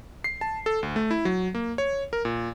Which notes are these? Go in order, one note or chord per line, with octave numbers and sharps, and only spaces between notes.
C7
A5
A4
D2
A3
E4
F#3
A#3
C#5
A#4
A#2